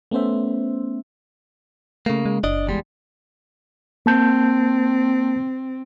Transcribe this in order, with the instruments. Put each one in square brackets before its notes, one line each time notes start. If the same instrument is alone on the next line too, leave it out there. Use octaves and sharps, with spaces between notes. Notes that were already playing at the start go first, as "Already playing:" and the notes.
[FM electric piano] A3 B3 C#4 C5 E5
[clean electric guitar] C#3 A#3 [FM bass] A3
[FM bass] G#3
[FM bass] F#1 [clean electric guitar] D4 D5 D#5
[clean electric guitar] E2 G3 G#3
[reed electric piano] A#3 A5 G6 [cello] C4